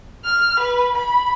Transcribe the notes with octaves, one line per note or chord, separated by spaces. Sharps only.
F6
B4
B5